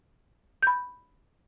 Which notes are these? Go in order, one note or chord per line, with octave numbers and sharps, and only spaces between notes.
B5 G6